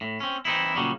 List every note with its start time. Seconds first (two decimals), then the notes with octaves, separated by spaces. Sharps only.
0.01 A2
0.20 C4 C#4
0.45 E3 C4 D#4 E4
0.75 A#2 C#3 F#3 G3